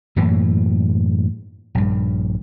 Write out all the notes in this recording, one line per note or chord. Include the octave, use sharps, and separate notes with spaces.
F#2 A2 E3 A#3
A#1 G2